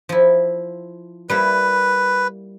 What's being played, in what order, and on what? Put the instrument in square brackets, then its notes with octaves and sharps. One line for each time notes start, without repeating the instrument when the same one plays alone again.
[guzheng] F3 E4
[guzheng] G3 A#3 E4 [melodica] B4